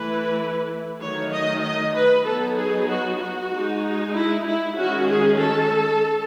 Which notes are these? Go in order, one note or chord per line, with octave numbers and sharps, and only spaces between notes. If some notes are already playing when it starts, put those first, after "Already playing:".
Already playing: E3 A3 E4 B4
D#3 F#3 A3 D#4 C#5
D#5
D#5
B4
F#3 B3 D#4 A4
G#4
F#4
F#4
G#3 D#4
E4
E4
D#3 G#3 C#4 F#4
G#4
A4